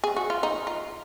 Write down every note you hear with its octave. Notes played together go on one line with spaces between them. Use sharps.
G#4
F#4
F4
D#4
F4